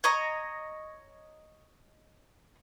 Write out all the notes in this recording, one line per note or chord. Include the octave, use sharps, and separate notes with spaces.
C#5 D#5 A#5